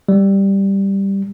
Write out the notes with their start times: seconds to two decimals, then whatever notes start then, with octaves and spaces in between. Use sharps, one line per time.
0.09 G3